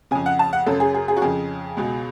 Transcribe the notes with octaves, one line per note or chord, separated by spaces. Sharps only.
F2 C#3 G#5
F#5
A5
F#5
F#2 C#3 A4
G#4
G#4
G#4
F#4
F2 C#3 G#4
C#2 B2